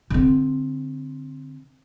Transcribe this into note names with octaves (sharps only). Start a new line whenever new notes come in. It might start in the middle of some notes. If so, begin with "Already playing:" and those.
D3 C4